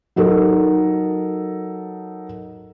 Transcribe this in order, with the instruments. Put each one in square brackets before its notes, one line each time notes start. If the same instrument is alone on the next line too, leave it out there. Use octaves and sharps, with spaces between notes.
[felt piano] F#3 D#4 A4 A#4